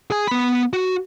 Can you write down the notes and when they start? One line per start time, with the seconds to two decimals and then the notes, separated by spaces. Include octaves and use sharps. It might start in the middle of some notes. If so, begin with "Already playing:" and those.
0.10 G#4 G#5
0.27 B3 B5
0.73 F#4